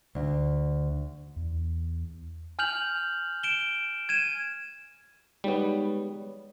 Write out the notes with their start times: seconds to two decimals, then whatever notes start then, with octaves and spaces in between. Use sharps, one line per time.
0.15 D2
1.36 E2
2.59 G#5 F6 G6 F7 F#7
3.43 D7 E7 G7
4.09 G#6 D#7 E7
5.44 G3 G#3 B3 D#4 C#5